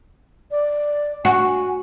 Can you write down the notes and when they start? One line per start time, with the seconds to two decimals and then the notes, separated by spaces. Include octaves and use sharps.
0.51 D5
1.25 F#4 G#5